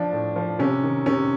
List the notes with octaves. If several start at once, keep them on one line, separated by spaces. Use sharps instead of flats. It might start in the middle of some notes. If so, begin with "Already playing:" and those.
Already playing: F3 D4
A2
F3
C3 C#4
D#3
C3 C#4